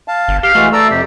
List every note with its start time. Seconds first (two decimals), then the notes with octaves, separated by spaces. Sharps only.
0.08 F5 A5
0.28 G1
0.43 G4 F5
0.55 E3 G#3 A3 F#4
0.73 A4 D5 A#5 E6
0.90 F2 C3 G4